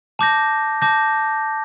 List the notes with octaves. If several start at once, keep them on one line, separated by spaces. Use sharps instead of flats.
A5 D6 G6 A#6
A5 D6 G6 A#6